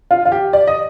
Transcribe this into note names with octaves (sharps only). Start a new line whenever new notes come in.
F4
F4
G4
D5
D#5